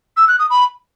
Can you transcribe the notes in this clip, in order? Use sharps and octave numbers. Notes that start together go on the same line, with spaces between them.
E6
F#6
D#6
B5